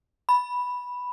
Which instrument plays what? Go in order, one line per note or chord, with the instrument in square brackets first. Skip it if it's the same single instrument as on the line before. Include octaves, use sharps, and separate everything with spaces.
[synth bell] B5